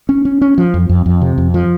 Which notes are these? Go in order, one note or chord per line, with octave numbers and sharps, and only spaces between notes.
C#4
C#4
C#4
F3
F2
F2
F2
C3
F2
F3